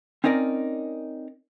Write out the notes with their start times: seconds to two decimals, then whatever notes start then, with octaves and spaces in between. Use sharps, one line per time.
0.24 C4 C#4 D#4 A#4 D5